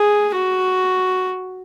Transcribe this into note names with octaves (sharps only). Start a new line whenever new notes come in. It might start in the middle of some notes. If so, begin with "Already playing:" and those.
Already playing: G#4
F#4